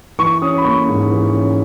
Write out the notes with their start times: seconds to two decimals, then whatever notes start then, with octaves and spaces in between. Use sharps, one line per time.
0.19 E3 C#6
0.42 C#4 D#6
0.58 B5
0.64 A#3 C#6
0.88 G#2
1.11 E3
1.34 C#4